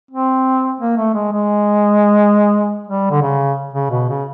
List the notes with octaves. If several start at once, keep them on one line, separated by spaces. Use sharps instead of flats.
C4
A#3
A3
G#3
G#3
G3
D3
C#3
C#3
B2
C#3